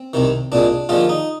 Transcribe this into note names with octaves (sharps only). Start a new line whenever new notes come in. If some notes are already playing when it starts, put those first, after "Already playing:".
Already playing: C4
C2 C3 D#3
C2 A#2 G#3 D4
D#2 D3 F3 G#3 F4
D#4